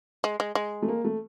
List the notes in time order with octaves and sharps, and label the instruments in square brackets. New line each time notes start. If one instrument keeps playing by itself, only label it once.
[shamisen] G#3
G#3
G#3
[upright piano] A3
A#3
A3